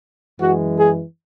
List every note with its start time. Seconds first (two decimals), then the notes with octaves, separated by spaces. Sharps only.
0.39 F#2 E3 G#3 F#4
0.78 G#4